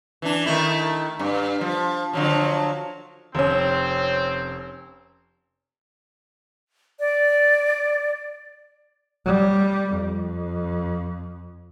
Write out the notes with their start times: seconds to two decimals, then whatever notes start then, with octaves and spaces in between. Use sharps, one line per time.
0.22 E3 D4
0.46 D#3 A3 E4
1.19 G2
1.61 F3
2.13 D3 F3 F#3
3.35 F1 C4 C#4
7.00 D5
9.26 G3
9.93 F2